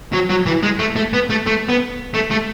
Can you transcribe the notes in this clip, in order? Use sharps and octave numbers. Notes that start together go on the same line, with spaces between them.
F#3
F#3
E3
G#3
A3
A3
B3
A3
A3
B3
A3
A3